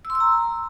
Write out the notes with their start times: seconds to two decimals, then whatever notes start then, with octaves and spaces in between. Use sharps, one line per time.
0.05 E6
0.10 C6
0.15 E6
0.20 A#5